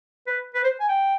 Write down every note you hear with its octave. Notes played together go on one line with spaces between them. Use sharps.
B4
B4
C5
G#5
G5